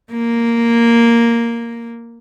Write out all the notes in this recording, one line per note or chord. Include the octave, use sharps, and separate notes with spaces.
A#3